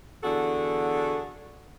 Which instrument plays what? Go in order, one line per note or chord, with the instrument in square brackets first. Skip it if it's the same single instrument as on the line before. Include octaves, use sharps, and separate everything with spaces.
[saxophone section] E2 D3 F#4 G#4 A4